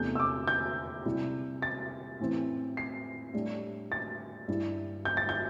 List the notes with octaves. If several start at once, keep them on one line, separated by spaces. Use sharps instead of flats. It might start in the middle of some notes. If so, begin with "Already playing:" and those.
Already playing: E2 C3 A3 D4 G6
E6
D6
G6
C3 G3 E4
A6
A2 E3 C4
C7
A2 G3 D4
A6
G2 G3 E4
G6
A6
G6